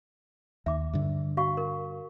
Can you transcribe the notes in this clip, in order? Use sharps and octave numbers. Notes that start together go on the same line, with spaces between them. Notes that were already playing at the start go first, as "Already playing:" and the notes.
D#2 E5 D6
G2 D3
F#4 F5 C#6
A#4